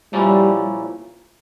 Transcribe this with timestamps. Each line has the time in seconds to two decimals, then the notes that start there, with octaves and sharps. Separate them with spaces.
0.12 A#2 F3 G3 A#3 C#4 E4